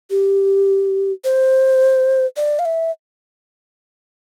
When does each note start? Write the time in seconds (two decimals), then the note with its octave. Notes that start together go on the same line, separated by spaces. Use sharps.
0.10 G4
1.24 C5
2.37 D5
2.59 F5
2.65 E5